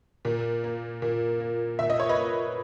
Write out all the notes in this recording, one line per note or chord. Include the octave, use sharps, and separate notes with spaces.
A#2
A#3
A#2
A#3
A#2 E5
D#5
C#5
B4 D#5
A#3